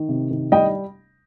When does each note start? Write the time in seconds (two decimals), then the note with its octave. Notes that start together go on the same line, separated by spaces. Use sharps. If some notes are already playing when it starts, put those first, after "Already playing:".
Already playing: D#3
0.09 C3
0.31 D#3
0.52 G3 D#5 G5